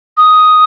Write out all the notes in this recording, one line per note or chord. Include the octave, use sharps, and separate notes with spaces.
D#6